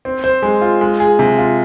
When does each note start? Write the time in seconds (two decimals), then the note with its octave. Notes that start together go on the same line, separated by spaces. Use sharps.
0.05 C4
0.24 C5
0.42 G#3
0.61 F4
0.81 G#3
1.00 G#4
1.19 C3
1.38 F4